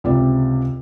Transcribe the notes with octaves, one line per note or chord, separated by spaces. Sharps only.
C#2 C3 D5